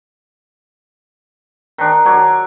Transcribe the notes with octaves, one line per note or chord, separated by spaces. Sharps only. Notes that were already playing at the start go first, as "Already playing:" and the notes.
D#3 D4
F#3 D4 C#5